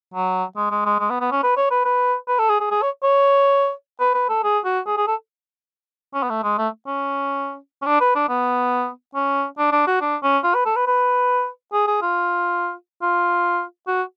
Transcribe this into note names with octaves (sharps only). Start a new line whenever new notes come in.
F#3
G#3
G#3
G#3
G#3
B3
B3
C#4
B4
C#5
B4
B4
B4
A4
G#4
G#4
G#4
C#5
C#5
B4
B4
A4
G#4
F#4
G#4
G#4
A4
C#4
B3
A3
G#3
A3
C#4
C#4
D4
B4
D4
B3
C#4
D4
D4
F#4
D4
C#4
F4
B4
A4
B4
B4
G#4
G#4
F4
F4
F#4